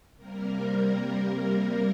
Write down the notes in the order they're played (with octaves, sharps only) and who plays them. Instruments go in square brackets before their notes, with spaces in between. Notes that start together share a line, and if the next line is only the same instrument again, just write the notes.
[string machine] C3 G3 A#3 A#4